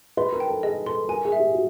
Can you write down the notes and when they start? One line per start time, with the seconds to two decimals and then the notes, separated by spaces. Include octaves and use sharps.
0.17 B4 C6
0.32 A#4
0.40 G5
0.48 A4
0.63 G#4 D#5
0.86 A4 C6
1.09 A#4 G#5
1.25 G#4
1.32 E5
1.40 G4
1.54 F#4